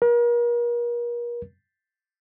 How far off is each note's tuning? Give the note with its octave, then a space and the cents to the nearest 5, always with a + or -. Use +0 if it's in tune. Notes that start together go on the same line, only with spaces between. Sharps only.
A#4 +40